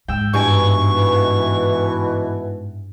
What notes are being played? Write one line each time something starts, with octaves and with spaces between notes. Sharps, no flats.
G#2 G5 E6
G2 B2 E3 G#5 C#6 D7